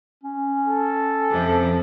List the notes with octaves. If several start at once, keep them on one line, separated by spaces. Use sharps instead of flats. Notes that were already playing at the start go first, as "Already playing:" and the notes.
C#4
A4
F2 C3